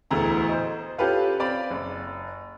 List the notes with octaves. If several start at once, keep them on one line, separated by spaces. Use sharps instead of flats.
E1 D2 A2 A#5
C5 D#5
C#4 F4 G4 A4 B4 F5
C4 D5 F5 B5
F#1